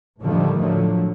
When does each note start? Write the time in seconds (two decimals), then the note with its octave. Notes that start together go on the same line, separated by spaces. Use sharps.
0.21 A2 D3 D#3 F3 G3 A3
0.58 A2 D3 F3 F#3 A3